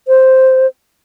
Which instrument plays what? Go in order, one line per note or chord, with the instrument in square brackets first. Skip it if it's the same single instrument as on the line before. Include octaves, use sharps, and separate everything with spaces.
[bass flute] C5